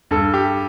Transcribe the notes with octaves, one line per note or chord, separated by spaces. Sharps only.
G2 A4
G4